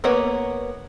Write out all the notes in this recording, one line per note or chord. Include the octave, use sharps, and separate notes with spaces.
A#3 B3 C#5 F#5